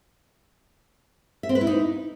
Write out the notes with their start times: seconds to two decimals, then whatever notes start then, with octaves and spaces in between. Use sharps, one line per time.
1.43 E5
1.49 C4
1.55 B4
1.61 E4
1.67 D#4